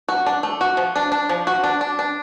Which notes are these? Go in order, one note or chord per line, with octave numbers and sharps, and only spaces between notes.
F#4
D4
A3
F#4
F3
D4
D4
F3
F#4
D4
D4
D4